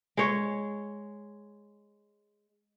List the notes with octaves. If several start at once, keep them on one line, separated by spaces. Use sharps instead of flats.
G#3 C#5